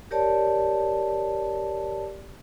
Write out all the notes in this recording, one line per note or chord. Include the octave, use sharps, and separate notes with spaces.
G4 A#4 C#5 D5 A5